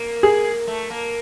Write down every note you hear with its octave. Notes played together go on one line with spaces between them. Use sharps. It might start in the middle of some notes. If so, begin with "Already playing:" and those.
Already playing: A#3
G#4
A3
A#3